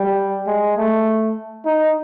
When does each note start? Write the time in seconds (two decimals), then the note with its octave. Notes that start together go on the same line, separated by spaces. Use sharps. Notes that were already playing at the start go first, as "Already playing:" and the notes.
Already playing: G3
0.47 G#3
0.77 A3
1.65 D#4